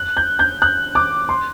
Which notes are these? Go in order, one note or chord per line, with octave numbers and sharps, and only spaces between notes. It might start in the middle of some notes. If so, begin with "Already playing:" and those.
Already playing: F#6
G6
G6
F#6
D6
C6